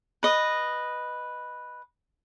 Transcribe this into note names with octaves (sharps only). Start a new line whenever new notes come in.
B4 D#5